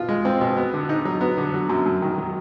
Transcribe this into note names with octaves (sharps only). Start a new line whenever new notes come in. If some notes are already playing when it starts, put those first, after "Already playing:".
Already playing: B2 F4
G#3
C4
B2
B3
D3
D#4
F#3
B3
D3
F#3
F#2
F#2
D#3
F#3